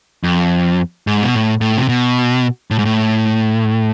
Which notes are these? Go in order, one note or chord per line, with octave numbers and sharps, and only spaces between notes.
F2
G#2
B2
A2
A2
C3
B2
A2
G#2
A2